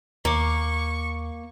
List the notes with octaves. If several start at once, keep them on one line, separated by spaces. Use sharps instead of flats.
D#2 A#3 A#5 C#6 D6